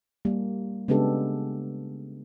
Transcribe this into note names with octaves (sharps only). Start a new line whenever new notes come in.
G3 A#3
C#3 G#3 B3 D4 G4 A4